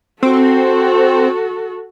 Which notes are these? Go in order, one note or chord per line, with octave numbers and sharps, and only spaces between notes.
C4 F#4 A4